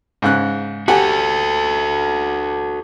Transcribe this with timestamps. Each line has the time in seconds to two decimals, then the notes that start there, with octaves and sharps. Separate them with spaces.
0.22 G#2 C#3 F#6
0.88 F#4 G4 A4 F#5 G#5